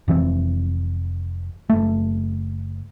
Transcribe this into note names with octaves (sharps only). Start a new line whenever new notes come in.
F1 E3 C4
F#1 A3